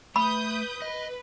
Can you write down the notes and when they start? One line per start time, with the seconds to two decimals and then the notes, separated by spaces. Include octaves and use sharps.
0.16 A3 B4 B5 D#6 G6
0.82 B4 D#5